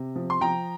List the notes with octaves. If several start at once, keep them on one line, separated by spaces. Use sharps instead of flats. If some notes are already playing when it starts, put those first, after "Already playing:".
Already playing: C3
F3
C6
F3 G5 A#5